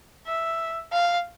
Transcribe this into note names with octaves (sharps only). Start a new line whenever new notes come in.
E5
F5